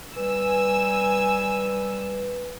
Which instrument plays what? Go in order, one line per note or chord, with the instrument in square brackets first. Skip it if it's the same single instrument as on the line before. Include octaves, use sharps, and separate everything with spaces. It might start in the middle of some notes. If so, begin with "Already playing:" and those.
[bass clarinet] G3 [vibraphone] B4 [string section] G#5 E6